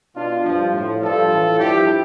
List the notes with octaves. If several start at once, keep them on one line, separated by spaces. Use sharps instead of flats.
B2 D4 F4
G2 F3
A2 F3
G2 F3 F4 A4
A2 E3
G2 F3 E4 G4